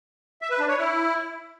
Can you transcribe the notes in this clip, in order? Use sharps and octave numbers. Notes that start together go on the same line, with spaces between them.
E5
B4
D4
C#5
E4